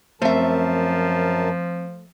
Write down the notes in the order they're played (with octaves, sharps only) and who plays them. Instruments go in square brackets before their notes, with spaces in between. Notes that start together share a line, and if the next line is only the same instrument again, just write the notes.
[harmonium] F#2 A#4 A5 [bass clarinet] F3 [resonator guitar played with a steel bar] A3 E5 [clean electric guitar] C4 C5